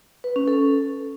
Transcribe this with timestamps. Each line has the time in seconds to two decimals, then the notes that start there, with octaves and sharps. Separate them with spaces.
0.24 B4
0.36 C#4
0.48 A4